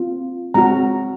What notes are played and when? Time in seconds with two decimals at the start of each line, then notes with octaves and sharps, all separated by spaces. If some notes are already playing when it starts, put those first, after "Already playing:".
Already playing: C4 F4
0.54 G#3 C4 F#4 A#5